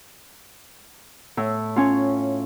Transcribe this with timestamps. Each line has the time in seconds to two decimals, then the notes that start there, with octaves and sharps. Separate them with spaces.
1.37 A2
1.76 C#4 F4